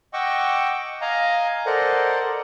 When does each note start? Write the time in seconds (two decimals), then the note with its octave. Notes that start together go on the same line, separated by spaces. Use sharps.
0.13 D#5 F#5 G5 C#6 D6 E6
1.01 D#5 F5 G#5 A#5
1.66 A4 A#4 C5 D5 D#5 F#5